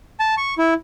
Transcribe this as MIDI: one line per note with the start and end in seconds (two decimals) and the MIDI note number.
0.20 0.35 81
0.37 0.54 85
0.58 0.74 64